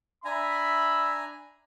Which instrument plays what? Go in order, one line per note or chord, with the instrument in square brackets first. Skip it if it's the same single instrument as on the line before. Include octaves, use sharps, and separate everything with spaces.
[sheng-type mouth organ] D4 G#5 A#5 [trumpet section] E5 B5